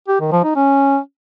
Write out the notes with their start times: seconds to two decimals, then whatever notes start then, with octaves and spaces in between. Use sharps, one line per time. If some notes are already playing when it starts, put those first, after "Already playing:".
0.08 G4
0.20 D#3
0.32 F3
0.44 D#4
0.56 C#4